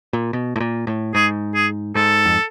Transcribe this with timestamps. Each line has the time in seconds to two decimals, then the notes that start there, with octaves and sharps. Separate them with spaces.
0.13 A#2
0.33 B2
0.56 A2
0.60 A#2
0.87 A2
1.14 G#2 G#4
1.55 G#4
1.95 G#2 A4
2.25 F2